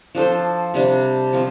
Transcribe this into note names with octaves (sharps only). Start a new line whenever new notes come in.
F3 D4 A4 C5
C3 G3 D4
F3 C4